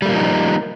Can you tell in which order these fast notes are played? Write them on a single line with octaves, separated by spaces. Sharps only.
G3 A3 A#3 F3 D#4